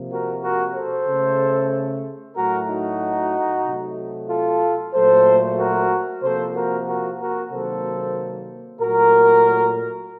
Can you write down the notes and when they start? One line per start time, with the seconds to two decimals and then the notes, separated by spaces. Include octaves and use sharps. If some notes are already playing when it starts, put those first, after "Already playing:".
Already playing: C3 F3 A#3
0.11 F#4 A#4
0.43 F#4 A#4
0.75 A4 C5
1.07 C#3 A3
2.36 A2 F#3 A3 F#4 A#4
2.68 D#4 F#4
3.65 C3 F#3 A3
4.29 F4 A4
4.93 A#2 F#3 A3 A4 C5
5.58 F#4 A#4
6.22 C3 F3 A#3 A4 C5
6.55 F#4 A#4
6.87 F#4 A#4
7.19 F#4 A#4
7.51 C3 D#3 F#3 A#3 A4 C5
8.80 A#2 F#3 A3 F#4 A#4